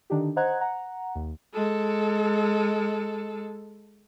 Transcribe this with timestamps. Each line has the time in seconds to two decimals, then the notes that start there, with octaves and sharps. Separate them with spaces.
0.10 D3 D#3 D4 D#4 G4
0.36 C5 D#5 F#5 A#5 F#6 G#6
0.61 F#5 A#5
1.15 D#2
1.54 G#3 A4